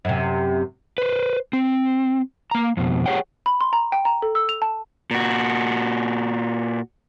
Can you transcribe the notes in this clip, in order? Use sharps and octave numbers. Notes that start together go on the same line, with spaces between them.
F#2 C3
B4 C5
C4
A#3 A#5
F2 B2
G4 G#4 C#5 F#5 G5
B5
C6
A#5
G5
A#5
A4
E6
F7
A5
A#2 F#4